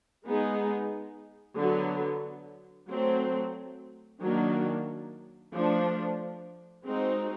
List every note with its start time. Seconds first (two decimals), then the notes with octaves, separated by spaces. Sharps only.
0.25 G#3 B3 D#4 G#4
1.56 D3 F#3 B3
2.88 F#3 A3 C4
4.21 D#3 F#3 A#3 D4
5.53 F3 A3 D4
6.85 G#3 C4 D#4 F#4